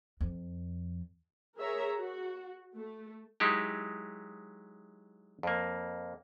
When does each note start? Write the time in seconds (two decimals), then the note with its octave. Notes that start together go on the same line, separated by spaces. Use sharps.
0.21 F2
1.57 G#4 A#4 C#5 E5 A#5
1.96 F#4
2.75 A3
3.40 F#3 G#3 D#4 E4 G4
5.43 F2 A#3